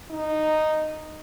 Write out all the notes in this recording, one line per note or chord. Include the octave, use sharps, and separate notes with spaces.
D#4